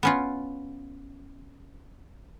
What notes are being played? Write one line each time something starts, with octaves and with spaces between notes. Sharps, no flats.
B3 C#4 F4